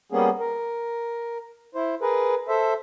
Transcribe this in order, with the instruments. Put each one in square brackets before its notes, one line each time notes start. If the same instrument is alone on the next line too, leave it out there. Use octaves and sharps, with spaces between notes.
[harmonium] G3 A#3 B3 C#4 G#4
A#4
E4 C5
G#4 A#4 B4
A4 C5 E5